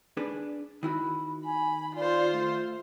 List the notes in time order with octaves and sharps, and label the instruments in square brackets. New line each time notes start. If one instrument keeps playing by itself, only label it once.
[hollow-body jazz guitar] D4 G#4 B4
[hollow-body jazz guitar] D#3 E4 F#4 [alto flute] B5
[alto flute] G#5 [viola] B5
[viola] F4 C5 [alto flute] D5
[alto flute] A3